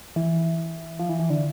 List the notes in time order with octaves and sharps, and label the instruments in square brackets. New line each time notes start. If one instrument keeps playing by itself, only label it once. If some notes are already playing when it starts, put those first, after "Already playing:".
[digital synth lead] E3
F3
E3
E3
D3